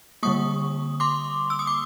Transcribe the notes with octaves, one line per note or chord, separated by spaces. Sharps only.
D3 G3 A#3 C#6 D#6
C6 D6
E6
D#6
D6